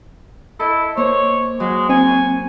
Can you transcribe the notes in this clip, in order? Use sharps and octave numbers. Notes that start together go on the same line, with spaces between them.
E4 A4 D#5
A#3 C5 C#5
F#3 G#3
C4 C#5 G#5